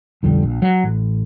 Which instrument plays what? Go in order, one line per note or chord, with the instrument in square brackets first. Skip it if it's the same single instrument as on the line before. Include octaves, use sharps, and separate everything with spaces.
[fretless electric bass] B1 F2 D3 G3
A#1
F#3
A1